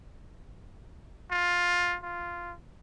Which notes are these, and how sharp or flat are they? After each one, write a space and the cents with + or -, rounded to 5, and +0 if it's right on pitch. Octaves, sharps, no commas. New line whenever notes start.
F4 +15
F4 -5